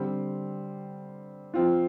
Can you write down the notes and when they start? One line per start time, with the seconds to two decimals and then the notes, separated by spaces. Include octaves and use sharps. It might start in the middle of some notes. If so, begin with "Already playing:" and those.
Already playing: D3 G3 C4
1.54 F3 C4 F4